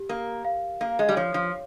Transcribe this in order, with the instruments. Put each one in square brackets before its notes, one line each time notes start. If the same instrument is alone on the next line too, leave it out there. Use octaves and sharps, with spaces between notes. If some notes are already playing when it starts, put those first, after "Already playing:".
Already playing: [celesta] G4
[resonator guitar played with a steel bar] A#3 [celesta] A#4
[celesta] F5
[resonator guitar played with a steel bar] A#3 [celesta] F5
[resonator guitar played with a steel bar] G#3
G3
[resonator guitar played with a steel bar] F3 [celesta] C#5
[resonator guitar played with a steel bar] F3